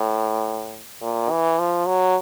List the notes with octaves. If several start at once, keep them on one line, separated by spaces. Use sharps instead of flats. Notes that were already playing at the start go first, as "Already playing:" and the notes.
Already playing: A2
A#2
E3
F3
F#3